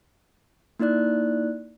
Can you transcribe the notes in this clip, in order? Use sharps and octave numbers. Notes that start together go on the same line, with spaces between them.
A#3 D#4 E4 D5 F#6